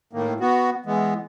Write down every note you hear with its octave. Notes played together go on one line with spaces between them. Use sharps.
A2 D#3 A#3
B3 F#4
E3 G#3 B3